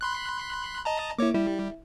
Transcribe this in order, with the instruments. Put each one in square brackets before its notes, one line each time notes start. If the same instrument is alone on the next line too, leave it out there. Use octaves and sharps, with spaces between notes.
[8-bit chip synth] B5 C6 F#6
D#5 A5 A#5
[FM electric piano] A#3 E4 [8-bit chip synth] C#5 D6
[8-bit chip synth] G3 [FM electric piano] E4